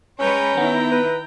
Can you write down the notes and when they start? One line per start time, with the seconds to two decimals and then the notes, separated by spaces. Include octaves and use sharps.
0.19 G#3 C#4 B4 C#5 G5 A#5
0.57 D#3 B3 E4
0.92 B4